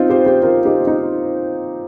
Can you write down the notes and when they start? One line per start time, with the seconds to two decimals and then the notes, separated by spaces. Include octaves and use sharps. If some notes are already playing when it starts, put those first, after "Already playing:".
Already playing: C4 D#4 F4
0.09 G4 C5
0.26 G4 C5
0.43 F4 A#4
0.65 D#4 G4
0.87 D#4